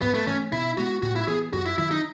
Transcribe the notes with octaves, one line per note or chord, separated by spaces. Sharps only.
G#2 B3
A3
E3 A3 C#4
B2 E4
G#3 B3 F#4
A2 F#4
E4
E3 B3 G#4
F#2 F#4
E4
D#3 F#3 E4
D#4